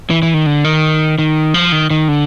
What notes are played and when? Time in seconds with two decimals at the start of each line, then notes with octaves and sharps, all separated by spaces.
0.10 E3
0.22 E3
0.34 D#3
0.46 D3
0.64 D#3
1.19 D#3
1.54 F3
1.72 D#3
1.90 D#3
2.08 D3